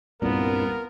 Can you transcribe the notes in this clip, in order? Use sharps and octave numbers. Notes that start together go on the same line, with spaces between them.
C2 G2 A#2 B3 F4 A#4